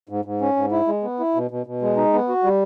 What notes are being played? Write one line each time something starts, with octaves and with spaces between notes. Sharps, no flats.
G#2
G#2
C#4
G#2
E4
G#3
B3
E4
B2
B2
B2
G#3
D#4
B3
F#4
G3